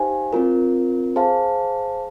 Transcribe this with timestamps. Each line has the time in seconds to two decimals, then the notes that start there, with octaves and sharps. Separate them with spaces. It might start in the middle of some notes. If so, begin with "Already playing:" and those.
Already playing: D#4 G4 C5 F5 G#5
0.33 C4 F4 A#4
1.16 G#4 C5 F5 A5